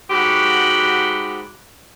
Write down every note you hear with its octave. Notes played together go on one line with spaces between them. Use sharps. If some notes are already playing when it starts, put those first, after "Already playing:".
G#2 F#4 G4 F#5 B5